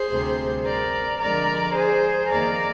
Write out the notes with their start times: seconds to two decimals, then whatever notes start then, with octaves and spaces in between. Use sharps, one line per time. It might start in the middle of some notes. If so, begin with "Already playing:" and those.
Already playing: G#4 C5
0.12 D2 C3 G3
0.66 A#4 D5
1.21 F2 D3 F3 G#3 A#4 D5
1.76 G#4 C5
2.30 F2 D#3 A#3 A#4 D5